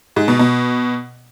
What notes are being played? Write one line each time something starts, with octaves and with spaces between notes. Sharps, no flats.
G#2
B2
B2